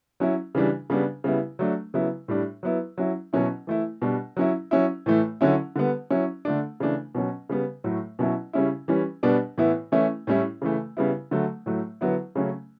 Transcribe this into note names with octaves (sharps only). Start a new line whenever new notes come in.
F#3 C#4 E4
C#3 E3 G3 D4
C#3 G3 B3 D4
C#3 G3 B3 E4
F#3 A3 D4
C#3 F#3 B3 E4
A2 G3 D4
F#3 B3 E4
F#3 C#4 E4
B2 F#3 C#4 E4
E3 A3 E4
B2 G3 D4
F#3 C#4 E4
F#3 C#4 E4
A2 E3 A3
D3 F#3 C#4 E4
D3 G3 B3
F#3 C#4 E4
D3 A3 D4
C#3 E3 A3 D4
B2 F#3 C#4
C#3 G3 B3
A2 F#3 A3
B2 F#3 C#4 E4
C#3 G3 C#4 E4
E3 G3 C#4
B2 G3 B3 D4
A2 E3 B3 E4
E3 A3 C#4 E4
A2 G3 C#4 E4
C#3 E3 A3
C#3 G3 B3 E4
D3 F#3 A3
A2 F#3 A3
D3 F#3 B3 E4
C#3 F#3 A3 C#4